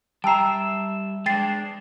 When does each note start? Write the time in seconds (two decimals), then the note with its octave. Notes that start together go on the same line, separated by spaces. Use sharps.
0.24 G3 E5 G5 A5 A#5 E6 C7
1.26 G#3 D4 G5 A6 C7